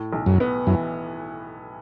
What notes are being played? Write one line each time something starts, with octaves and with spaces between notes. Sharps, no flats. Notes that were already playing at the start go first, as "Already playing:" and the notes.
Already playing: A2
B1
F#2
B3
F#2 E3